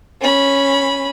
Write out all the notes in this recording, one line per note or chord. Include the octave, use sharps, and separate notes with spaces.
C#4 B5